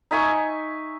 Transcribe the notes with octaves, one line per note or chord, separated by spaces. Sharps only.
D#4 E5 G#5 C#6